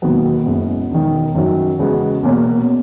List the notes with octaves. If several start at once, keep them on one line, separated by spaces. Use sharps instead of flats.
E1 D#2 D#3 F#3 B3
F#1 F#2 C#3 G#3 B3
E1 E2 D#3
F#2 D#3 F#3
E2 C#3 G#3 B3 F#4
E1 E2 B2 A#3 C#4